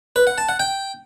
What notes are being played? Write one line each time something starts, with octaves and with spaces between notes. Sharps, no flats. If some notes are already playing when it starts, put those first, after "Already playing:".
B4
F#5
A5
F#5
G5